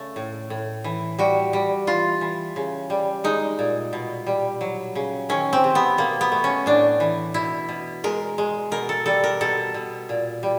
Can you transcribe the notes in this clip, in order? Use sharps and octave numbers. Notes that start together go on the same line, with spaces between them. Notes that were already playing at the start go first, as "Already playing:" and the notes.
Already playing: C#3 A3
A2
A2
E3
G3 F#4
G3
E3 F4
E3
C#3
G3
G#3 D#4
A#2
B2
G3
F#3
C#3
D#3 C#4
C4
C3
B3
B2 A#3
B3
A3
C#4
A2 D4
E3
B2 E4
B2
G#3 A#4
G#3
B2 A#4
A4
G3 A4
A#4
B2 A4
B2
A#2
G3